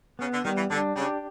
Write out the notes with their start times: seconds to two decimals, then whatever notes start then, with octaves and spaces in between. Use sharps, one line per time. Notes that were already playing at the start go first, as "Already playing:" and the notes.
0.19 C#3 B3
0.32 D3
0.44 D#3 G3
0.57 E3
0.70 D3 D4
0.96 C#3 G4